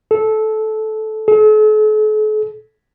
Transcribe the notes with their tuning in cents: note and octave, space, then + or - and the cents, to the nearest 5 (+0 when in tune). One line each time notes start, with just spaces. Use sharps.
A4 -15
A4 -45